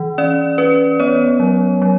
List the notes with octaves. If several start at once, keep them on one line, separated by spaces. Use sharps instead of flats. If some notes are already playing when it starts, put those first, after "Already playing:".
Already playing: E3
C#4 D5
C#4 B4
B3 C#5
F#3
F#3